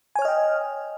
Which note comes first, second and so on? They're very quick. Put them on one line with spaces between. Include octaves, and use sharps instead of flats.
G#5 C#5 F6 D#5 G5